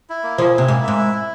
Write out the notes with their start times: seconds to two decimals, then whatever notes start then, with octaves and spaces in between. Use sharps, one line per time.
0.09 E4
0.24 A#3
0.38 F3 G#4
0.54 C3 E4
0.68 G#2 A#3
0.83 G#2 E5
0.98 E4
1.13 E4